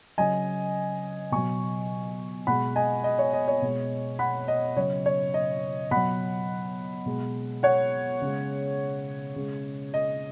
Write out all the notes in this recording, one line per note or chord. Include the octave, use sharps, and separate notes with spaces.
C#3 F#3 D#5 G#5
B2 F#3 G#5 C#6
B2 G#3 F#5 B5
D#5 G#5
D#5
C#5
D#5
C#5
B2 G#3
F#5 B5
D#5
C#3 F#3 C#5
C#5
D#5
B2 F#3 F#5 B5
B2 G#3
C#5 F#5
C#3 G#3
C#3 G#3
D#5